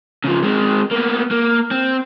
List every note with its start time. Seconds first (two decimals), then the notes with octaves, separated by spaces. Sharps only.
0.24 C#3 F3
0.42 G#3 C4
0.91 A#3 B3
1.31 A#3
1.71 C4